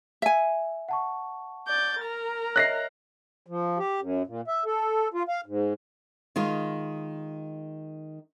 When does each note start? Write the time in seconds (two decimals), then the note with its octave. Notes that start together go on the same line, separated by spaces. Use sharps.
0.22 E5 G#5
0.89 F#5 A5 C#6
1.67 D5 G6 A6
2.01 A#4 A#5
2.56 C#5 D#5 E5 F#6 A#6 C7
3.47 F3
3.78 G4
4.01 F#2
4.27 A#2
4.48 E5
4.65 A4
5.14 F4
5.29 F5
5.46 G#2
6.36 D#3 G#3 F4